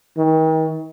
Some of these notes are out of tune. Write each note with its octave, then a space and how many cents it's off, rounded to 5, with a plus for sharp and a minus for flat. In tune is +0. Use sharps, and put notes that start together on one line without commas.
D#3 +35